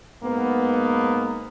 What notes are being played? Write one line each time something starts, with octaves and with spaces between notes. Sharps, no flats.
G#2 A#3 B3